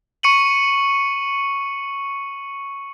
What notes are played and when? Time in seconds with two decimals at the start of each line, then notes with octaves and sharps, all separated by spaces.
0.23 C#6 C#7 D#7 F#7